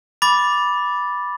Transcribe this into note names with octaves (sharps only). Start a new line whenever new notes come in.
B5 D6 A6